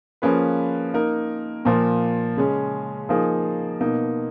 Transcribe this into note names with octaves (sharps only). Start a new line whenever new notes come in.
F3 A#3 C#4 G#4 B4
A#3 D#4 A#4
A#2 F3 A#3
C#3 G#3 C#4
F3 A#3 D#4 G#4
B2 A#3 D#4